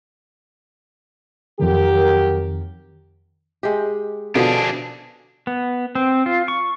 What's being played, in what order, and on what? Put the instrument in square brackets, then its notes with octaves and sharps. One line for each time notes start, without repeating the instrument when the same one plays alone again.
[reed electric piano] F2 D#3 [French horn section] F#3 G4 A#4
[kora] G#3 G4
[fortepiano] B2 [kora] D3 F3 [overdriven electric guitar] D4 G#4
[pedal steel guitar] B3
C4
F4
C#6